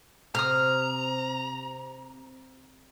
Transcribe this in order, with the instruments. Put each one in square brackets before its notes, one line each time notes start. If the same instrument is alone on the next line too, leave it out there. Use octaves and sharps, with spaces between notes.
[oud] C3 [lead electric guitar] A#5 [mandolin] D#6 F6